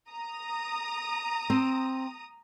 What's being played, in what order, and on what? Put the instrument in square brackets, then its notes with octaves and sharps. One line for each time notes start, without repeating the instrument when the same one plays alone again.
[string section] A#5 D#6
[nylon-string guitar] C4